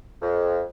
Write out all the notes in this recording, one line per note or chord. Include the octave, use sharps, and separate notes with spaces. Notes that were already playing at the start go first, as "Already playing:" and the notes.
F2